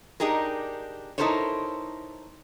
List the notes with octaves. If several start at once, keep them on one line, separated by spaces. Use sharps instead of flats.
D4 D#4 G4 G#4 A#4
D#4 E4 A4 A#4 C5 C#5